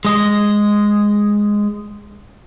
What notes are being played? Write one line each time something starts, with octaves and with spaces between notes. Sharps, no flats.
G#3 D#5